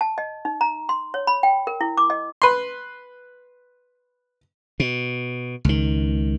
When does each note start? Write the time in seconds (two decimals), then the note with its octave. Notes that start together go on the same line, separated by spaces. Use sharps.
0.01 A5
0.18 D#5
0.45 D#4
0.61 A#5
0.89 C6
1.14 C#5
1.27 B5
1.43 G5
1.67 A#4
1.81 E4
1.97 D6
2.10 D#5
2.42 B4 C6
4.80 B2
5.65 C#2 D#3